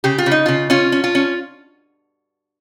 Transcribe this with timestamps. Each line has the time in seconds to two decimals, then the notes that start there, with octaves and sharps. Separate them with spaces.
0.04 C#3 G4
0.18 F4
0.26 C#3
0.32 D#4
0.46 C#3 F4
0.70 C#4 F4
0.92 C#4
1.04 F4
1.15 C#4